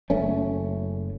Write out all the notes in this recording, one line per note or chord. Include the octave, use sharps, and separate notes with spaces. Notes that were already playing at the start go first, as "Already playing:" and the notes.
F#1 A3 C#4